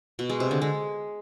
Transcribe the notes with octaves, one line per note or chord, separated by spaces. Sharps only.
B2
G#3
C3
D3
G#3